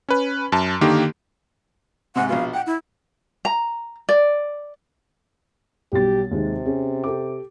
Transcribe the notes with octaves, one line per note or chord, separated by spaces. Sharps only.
C#4 B4
F#2 A5
D3 D#3 A#3 G4
G#2 C3 F#5
A#1 B2 F5
F#5 G5
E4
A#5
D5
B1 G3 G4 A6
D#2 C3 G#3 D#4
C#4 G#4
G4 A4 D6